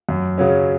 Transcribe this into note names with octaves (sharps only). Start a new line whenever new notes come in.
F#2
C#3 F#3 C#4